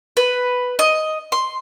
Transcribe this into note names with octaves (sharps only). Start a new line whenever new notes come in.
B4
D#5
C6